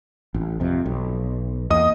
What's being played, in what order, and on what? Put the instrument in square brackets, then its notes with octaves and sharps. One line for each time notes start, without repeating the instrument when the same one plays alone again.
[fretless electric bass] A1
F2 C3
B1
[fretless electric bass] E2 A#3 [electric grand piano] D#5 D#6